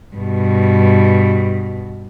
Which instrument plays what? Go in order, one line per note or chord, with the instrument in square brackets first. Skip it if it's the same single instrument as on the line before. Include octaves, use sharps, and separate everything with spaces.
[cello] G2 B2